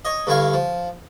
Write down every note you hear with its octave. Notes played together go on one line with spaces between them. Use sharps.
C#5 D#5
G2 D3 E4 C#5 F5
F3